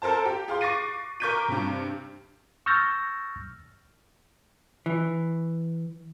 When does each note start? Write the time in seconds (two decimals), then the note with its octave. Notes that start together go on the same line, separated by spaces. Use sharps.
0.02 A4 A#4 C5 A5
0.25 G4
0.48 G#4 F5 C6
0.61 C#6 D6 A6 A#6 C7 D#7
1.20 A#4 C#6 D6 G6 B6 D#7
1.48 G2 C3
2.66 C#6 E6 F6 G6 A6 A#6
4.86 E3